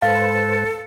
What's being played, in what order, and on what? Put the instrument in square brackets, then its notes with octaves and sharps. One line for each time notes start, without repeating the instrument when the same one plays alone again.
[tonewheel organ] G#2 B4 C5 [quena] A4 [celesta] F5 [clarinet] A5